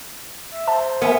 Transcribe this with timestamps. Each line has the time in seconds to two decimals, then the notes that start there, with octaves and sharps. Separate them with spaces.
0.52 E5
0.67 C5 E5 A5
1.02 B3 A#4 E5 G#5